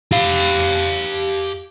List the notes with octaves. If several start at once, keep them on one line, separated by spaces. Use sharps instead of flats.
G4 F5